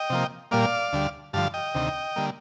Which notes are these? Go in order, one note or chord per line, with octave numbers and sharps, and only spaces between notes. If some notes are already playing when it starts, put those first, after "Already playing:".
Already playing: D#5 G5
C3 F3 A#3
A#2 G3 A#3 D5 F5
D2 D3 G3
G2 D3 F3 F5 A5
D#5 G5
D2 C3 D#3
D3 G3 A#3